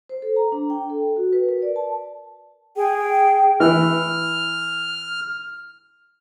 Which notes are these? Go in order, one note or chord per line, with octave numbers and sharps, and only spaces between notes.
C5
A4
A#5
D4
G5
A4
F#4
B4
A#4
D5
A5
G#4 G5
E3 F6